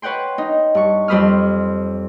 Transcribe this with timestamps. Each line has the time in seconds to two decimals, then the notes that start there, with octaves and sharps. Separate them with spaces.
0.02 B4 C#5 F#5 G5 C6
0.38 D#4
0.75 G2 C#6
1.08 F2 G3 C5 B5 D#6 F6